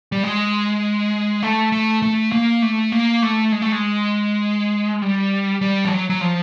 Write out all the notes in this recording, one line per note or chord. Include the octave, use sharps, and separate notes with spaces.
G3
G#3
A3
A3
A3
A#3
A3
A#3
A3
G#3
A3
G#3
G3
G3
F3
F#3
F#3
F3